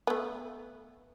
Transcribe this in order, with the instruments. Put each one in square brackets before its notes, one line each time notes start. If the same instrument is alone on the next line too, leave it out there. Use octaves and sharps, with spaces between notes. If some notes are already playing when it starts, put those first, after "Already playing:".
[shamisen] A3 B3